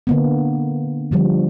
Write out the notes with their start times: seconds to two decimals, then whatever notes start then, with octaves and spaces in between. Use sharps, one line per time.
0.07 D3 A#3 B3
1.12 D3 F3 G3